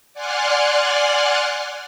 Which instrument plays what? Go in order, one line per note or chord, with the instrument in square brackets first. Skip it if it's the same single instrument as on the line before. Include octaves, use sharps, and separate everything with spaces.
[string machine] D5 F#5 G#5 C6 F6 F#6